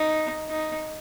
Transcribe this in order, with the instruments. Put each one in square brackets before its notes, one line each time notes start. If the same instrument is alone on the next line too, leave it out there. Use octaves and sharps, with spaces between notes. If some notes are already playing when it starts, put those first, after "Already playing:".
Already playing: [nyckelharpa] D#4
D#4